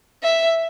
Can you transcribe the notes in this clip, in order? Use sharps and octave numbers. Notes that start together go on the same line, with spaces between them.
E5